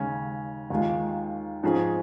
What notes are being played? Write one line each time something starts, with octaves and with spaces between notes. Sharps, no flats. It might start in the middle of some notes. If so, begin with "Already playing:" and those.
Already playing: D#2 C#3 G#3 C#4
D#2 D#3 G#3 F4
G#2 F3 C#4 G#4